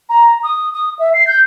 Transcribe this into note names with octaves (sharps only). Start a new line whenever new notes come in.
A#5
D#6
D#6
E5
C7
G6